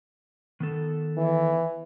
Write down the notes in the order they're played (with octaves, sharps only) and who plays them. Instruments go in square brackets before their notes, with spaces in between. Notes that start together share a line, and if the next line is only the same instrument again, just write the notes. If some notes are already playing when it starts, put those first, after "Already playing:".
[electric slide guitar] D#3 B3 A4
[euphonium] E3